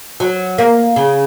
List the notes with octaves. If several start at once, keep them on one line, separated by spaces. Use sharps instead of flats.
F#3
A#3
C#3